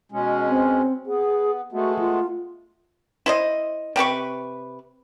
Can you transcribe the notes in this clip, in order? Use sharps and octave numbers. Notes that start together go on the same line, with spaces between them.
B2 G#3 C#4
C4
B3 G#4
G#3 A3 B3 F#4
F4
E4 C5 D#5
C3 G4 B4 C#6